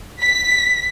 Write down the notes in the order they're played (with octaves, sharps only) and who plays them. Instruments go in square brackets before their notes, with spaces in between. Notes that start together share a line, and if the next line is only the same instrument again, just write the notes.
[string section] B6